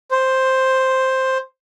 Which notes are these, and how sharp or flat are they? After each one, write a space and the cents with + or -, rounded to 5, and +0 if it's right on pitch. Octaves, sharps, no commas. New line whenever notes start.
C5 +5